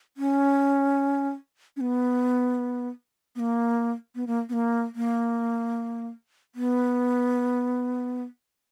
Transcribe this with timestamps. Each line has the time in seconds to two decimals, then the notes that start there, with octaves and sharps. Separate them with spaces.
0.17 C#4
1.77 C#4
1.81 B3
3.36 B3
3.40 A#3
4.15 B3
4.27 A#3
4.49 B3
4.53 A#3
4.95 A#3
6.55 B3